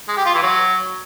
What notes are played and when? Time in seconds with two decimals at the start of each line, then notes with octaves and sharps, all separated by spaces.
0.08 G#3
0.17 G4
0.26 F4
0.34 E3
0.43 F#3